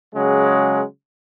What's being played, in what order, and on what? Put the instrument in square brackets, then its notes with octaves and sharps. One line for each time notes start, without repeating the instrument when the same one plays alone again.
[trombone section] C#3 F#3 G#3